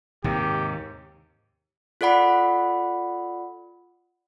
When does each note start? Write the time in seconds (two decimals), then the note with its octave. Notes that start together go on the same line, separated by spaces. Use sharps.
0.24 D#2 G#2 C3 G4
2.01 F4 A4 D5 F#5 B5